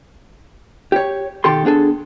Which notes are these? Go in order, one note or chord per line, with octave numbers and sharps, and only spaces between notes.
G4 C#5
B2 D#3 G4 A4 C6
B3 D4 G#4 A4